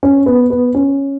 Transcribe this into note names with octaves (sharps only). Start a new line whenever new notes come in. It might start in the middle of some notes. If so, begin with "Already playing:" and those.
C#4
B3
B3
C#4